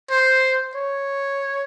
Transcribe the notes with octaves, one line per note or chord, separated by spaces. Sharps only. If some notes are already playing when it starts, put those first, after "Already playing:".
C5
C#5